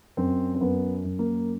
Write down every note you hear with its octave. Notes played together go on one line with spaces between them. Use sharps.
F#2 C4
C4
F#2 B3
F#2
A#3